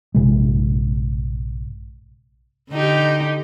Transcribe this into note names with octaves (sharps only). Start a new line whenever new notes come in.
A#1 G2 C3 G#3
D3 D#4 G4